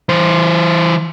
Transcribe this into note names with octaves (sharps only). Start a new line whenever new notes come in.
E3 C5